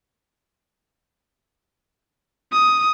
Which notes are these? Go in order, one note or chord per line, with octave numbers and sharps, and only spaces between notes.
D#6